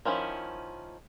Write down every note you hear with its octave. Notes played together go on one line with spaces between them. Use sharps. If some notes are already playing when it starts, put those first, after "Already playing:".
D#3 F3 C#4 E4